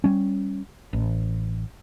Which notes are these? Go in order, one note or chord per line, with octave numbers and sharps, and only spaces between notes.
G3 C#4
A1